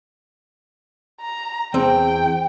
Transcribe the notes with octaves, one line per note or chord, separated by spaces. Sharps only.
A#5
E2 C4 G5